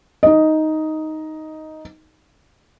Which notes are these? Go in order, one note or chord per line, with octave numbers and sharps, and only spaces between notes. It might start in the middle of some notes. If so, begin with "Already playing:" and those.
D#4 D#5